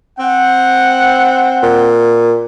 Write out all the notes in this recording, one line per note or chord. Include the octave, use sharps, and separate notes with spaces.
C4 F#5
A#2